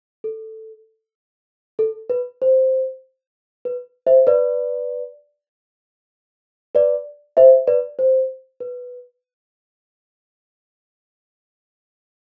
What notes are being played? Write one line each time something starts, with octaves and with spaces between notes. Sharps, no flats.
A4
A4
B4
C5
B4
C5 E5
B4 D5
B4 D5
C5 E5
B4 D5
C5
B4